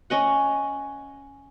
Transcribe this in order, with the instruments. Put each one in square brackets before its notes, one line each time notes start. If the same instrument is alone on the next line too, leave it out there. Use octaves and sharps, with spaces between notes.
[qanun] C#4 D#5 F#5